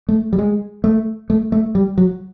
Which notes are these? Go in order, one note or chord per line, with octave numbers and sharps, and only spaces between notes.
A3
G3
G#3
A3
A3
A3
G3
F#3